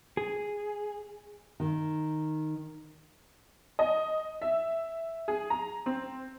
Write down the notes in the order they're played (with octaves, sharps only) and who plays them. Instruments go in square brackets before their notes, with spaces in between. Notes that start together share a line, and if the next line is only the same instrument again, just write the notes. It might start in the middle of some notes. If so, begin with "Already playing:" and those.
[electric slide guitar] G#4
[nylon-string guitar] D#3
[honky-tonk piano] D#5
E5
G#4
A#5
C4